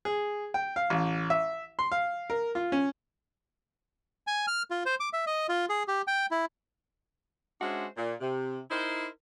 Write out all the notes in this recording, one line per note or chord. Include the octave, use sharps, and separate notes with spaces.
G#4
G5
F5
A1
E5
C6
F5
A#4
F4
C#4
G#5
F6
F4
C5
D6
E5
D#5
F4
G#4
G4
G5
E4
G#3 C#4 D4 F#4 C5 E5
A#2
C3
D#4 E4 A#4 C5